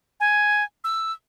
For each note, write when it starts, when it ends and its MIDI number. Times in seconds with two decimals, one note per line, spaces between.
0.20 0.64 80
0.84 1.12 88